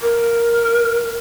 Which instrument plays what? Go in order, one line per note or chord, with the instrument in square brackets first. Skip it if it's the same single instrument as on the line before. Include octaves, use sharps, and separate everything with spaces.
[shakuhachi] A#4